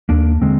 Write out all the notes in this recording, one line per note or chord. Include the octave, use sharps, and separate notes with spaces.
D#2 A#3 D4
D3 G#3 C4